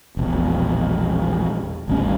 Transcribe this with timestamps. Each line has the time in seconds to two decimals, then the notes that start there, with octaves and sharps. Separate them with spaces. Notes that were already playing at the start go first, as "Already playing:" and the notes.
0.17 E1 A#1
1.88 G#1 D2 G3 C#4